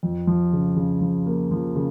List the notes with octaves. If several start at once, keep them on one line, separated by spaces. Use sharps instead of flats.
F2
F3
C#3
C#3
F3
A#3
F3
C#3